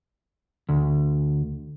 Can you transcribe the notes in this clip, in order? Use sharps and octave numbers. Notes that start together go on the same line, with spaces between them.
D2